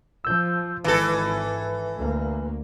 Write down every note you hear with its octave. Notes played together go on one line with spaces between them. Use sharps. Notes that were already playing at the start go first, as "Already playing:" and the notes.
F3 E6 G6
G#1 E3 A4 B4
D2 A#3